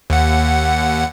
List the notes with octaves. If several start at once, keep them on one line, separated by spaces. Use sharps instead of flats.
D#2 F#5